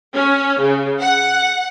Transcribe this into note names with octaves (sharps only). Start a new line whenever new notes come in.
C#4
C#3
F#5